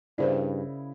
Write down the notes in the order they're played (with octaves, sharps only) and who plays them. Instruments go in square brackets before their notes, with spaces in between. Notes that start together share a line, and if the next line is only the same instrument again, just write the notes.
[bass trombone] G2 [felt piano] C#3 E4 [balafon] A#4 C5 D5